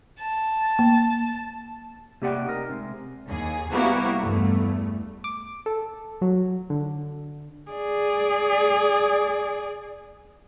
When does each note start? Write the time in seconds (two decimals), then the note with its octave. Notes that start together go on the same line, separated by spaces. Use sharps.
0.19 A5
0.79 A#3
2.22 C3 A#3 G4 D5 F#5 G5
2.46 D#4 A#4
2.69 C3 G#3
3.28 D#2 G#4
3.72 C3 G3 A#3 B3 E4 F#4
4.20 E2 G2 A3
5.24 D6
5.66 A4
6.22 F#3
6.70 D3
7.71 G#4 D5